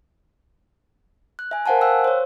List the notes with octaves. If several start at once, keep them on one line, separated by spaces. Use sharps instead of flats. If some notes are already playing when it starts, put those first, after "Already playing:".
F#6
E5 G#5
A#4 C5 F5 F#5 G#5 A5
F5 G5 E6 F#6
C5 C#5